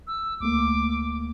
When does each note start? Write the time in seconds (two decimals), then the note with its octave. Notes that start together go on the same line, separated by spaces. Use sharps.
0.07 E6
0.40 D2 A3 A#3 D6